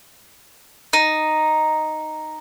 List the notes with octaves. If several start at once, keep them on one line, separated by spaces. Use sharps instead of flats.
D#4